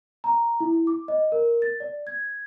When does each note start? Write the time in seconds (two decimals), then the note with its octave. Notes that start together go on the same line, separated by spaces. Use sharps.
0.24 A#5
0.60 E4
0.74 E4
0.87 D6
1.08 D#5
1.32 A#4
1.62 A6
1.80 D5
2.07 G#6